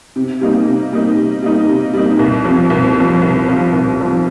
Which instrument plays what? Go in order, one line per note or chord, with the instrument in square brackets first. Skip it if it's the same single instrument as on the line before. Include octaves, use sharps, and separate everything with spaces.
[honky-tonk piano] C3
G3 A#3 D#4
C3
G3 A#3 D#4
C3
G3 A#3 D#4
C3
G3 A#3 D#4
C2
C3 F3
C2
C3 F3
C2
C3 F3
C2
C3 F3